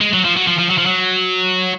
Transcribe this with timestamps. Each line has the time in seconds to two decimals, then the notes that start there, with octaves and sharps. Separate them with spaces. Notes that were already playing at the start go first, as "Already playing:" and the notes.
0.01 G#3
0.14 F#3
0.25 F3
0.37 F#3
0.48 F3
0.59 F3
0.70 F#3
0.78 F3
0.86 F#3